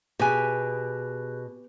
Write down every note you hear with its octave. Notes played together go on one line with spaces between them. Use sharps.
B2 G4 G#4 G#5 F#6